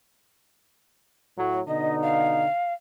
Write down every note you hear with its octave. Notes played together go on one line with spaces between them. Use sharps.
A2 F#3
B2 D3 D#4 D#5
F5